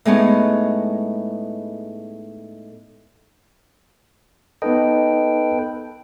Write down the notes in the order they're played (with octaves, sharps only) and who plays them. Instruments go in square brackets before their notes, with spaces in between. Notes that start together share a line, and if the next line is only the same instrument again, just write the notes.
[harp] A2 G#3 B3 C#4 D#4
[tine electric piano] B3 D#4 D#5 [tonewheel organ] A4 B4 G5